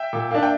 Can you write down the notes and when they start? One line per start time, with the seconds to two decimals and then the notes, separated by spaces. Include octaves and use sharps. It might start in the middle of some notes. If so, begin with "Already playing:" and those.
Already playing: E5 G5
0.13 A#2
0.31 A#3 D4
0.43 G5